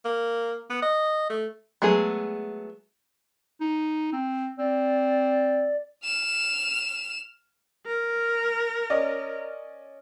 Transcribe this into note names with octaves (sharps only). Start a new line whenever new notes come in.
A#3
B3
D#5
A3
F#3 G#3 A3 B3 G#4
D#4
C4
C4 D5
F6 E7
A#4
C#4 D5 D#5